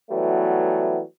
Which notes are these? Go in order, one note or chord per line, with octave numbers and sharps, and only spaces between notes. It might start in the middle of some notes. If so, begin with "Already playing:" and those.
E3 F#3 G3 A3 B3